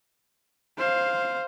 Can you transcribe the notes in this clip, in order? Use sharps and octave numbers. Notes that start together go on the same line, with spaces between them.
C5 F5